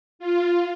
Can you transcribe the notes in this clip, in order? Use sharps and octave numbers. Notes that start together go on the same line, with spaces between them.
F4